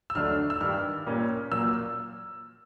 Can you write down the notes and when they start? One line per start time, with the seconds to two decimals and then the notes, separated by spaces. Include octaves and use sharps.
0.10 E6
0.15 D2 D3 F#3 A3 D4 F6
0.50 E6
0.61 G2 D#3 G3 F6
1.06 A#2 G3 A#3 C#4
1.51 A#2 F#3 A#3 E6